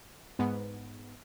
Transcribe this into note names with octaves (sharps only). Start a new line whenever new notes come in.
G#2 B3